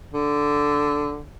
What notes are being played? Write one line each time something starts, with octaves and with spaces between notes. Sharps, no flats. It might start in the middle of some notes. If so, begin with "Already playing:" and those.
D3